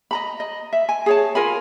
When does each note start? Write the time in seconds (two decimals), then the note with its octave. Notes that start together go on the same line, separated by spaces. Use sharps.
0.11 D#5 A#5 B5
0.40 D#5
0.73 E5
0.89 G#5
1.06 G#4 C#5 A5
1.35 F4 A#4 G#5 B5